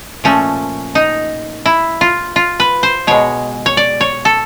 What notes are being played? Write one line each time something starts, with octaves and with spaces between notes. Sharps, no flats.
A#2 F3 A3 C#4
D#4
E4
F4
F4
B4
C5
B2 G#3 C#5
C#5
D5
C#5
A4